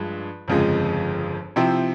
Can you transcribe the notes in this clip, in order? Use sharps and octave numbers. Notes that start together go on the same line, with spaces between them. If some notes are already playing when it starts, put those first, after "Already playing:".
Already playing: G2 F3 G#3
G1 F2 C#3 F3 G#3
C3 F3 C4 E4